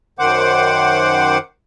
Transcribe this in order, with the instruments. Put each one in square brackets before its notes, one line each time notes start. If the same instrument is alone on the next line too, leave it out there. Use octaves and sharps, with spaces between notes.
[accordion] F#2 D#3 C5 F#5 D6